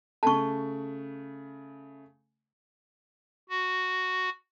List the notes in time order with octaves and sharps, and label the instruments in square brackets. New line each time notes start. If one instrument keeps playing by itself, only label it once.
[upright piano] C#3 A3 [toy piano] A5 C#6
[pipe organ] F#4